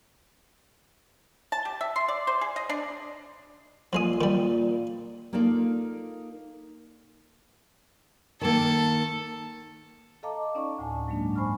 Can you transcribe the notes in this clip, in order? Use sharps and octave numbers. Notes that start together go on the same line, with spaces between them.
A5
G4
E5
C6
D5
C5
G#4
D#5
D4
A#2 F3 G#3 D#6
D#3 G3
A#3 D#4 F4 A4 D5
D#3 A#3 A4
A4 D#5 F5 A5 A#5 D6
C#4 D#4 D5 A5 C#6
D2 A2 G#5 A5
G2 F#3 G#3 A#3 D4
C5 G#5 B5 C#6 F6